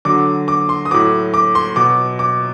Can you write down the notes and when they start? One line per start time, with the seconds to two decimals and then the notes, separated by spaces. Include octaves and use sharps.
0.05 D3 F#3 D6
0.48 D6
0.69 C6
0.85 D#6
0.91 A2 F#3 D6
1.34 D6
1.55 C6
1.76 B2 F#3 D6
2.19 D6